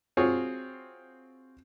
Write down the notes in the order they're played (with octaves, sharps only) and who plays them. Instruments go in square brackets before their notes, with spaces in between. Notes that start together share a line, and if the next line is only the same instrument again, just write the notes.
[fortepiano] C4 F4 F#4 G#4 C#5